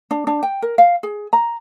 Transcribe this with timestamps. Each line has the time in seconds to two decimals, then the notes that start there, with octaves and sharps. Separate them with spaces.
0.11 D4
0.27 D4
0.43 G5
0.62 A#4
0.78 F5
1.03 G#4
1.33 A#5